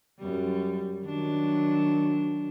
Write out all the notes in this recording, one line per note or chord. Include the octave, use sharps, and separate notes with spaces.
F#2 G3
D#3 F#3 D4